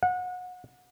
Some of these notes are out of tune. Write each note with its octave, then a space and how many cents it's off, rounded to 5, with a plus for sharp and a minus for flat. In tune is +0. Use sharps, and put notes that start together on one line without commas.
F#5 -30